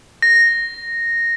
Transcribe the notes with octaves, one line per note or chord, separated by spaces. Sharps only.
A#6